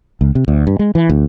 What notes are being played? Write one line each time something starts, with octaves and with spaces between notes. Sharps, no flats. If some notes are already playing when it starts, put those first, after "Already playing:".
C#2
C3
D2
G2
G#3
E3
D2